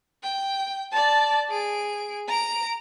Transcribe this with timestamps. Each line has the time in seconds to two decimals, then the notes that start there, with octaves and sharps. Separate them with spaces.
0.23 G5
0.91 D5 A5
1.50 G#4 D7
2.28 A#5 D7